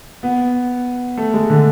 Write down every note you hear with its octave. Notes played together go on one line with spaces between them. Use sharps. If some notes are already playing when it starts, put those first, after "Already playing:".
B3
A3
G#3
D3